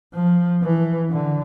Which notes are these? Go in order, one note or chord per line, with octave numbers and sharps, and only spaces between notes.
F3
E3
D3